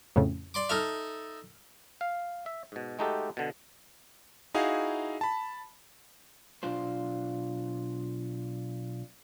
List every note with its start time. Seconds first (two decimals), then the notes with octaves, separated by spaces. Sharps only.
0.16 F2 A2 C#3
0.54 D5 C6 D6
0.69 D#4 A4 E5 F6
2.01 F5
2.46 E5
2.72 G#2 B2
2.99 G#3 A3 D#4 F#4 G4 A4
3.37 B2 D3
4.54 D#4 E4 F#4 G#4 F5
5.21 A5 B5
6.63 B1 D4 F4 C5